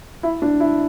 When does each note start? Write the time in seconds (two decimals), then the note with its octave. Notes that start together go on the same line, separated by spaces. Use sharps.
0.23 E4
0.42 D4
0.60 E4